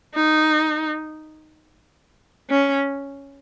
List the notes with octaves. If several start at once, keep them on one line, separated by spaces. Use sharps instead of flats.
D#4
C#4